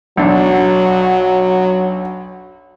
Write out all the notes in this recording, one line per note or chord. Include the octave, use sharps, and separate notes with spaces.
B1 F#3 D4